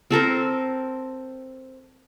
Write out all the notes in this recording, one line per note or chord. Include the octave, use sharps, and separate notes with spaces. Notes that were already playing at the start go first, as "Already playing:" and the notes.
C4 A4 A#4 C5